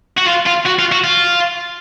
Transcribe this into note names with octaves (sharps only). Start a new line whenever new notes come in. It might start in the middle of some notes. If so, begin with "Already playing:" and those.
F#4
F4
F4
F#4
F4
F#4
F4